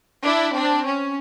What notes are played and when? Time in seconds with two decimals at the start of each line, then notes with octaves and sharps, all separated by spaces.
0.24 D4 E4
0.55 C4 D4
0.87 C#4